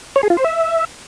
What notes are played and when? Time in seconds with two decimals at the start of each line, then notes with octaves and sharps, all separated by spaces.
0.16 C#5
0.23 G#4
0.30 F4
0.37 C5
0.44 E5